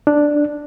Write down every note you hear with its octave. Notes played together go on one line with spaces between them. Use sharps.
D4